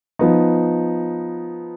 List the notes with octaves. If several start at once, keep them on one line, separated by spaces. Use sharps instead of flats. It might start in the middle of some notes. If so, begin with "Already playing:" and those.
F3 B3 D#4